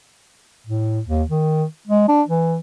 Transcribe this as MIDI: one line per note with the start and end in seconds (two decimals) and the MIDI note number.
0.66 1.00 45
1.08 1.24 39
1.29 1.64 51
1.87 2.07 56
2.08 2.23 62
2.28 2.58 52